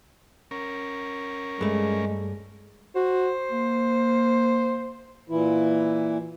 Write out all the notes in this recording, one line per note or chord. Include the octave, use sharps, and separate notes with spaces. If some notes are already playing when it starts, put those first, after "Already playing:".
C#4 A#4
G2 G#3 A3
F#4 C5
A#3
A#2 E3 E4